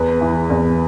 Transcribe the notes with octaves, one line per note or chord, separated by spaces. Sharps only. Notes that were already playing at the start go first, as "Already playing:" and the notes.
Already playing: E2 B4
E3
E2